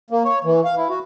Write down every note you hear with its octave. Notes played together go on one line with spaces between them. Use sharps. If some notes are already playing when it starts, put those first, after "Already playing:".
A#3
C#5
E3
F5
E4
F#4